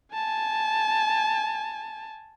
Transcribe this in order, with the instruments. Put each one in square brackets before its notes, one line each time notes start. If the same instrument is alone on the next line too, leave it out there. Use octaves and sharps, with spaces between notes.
[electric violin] G#5 A5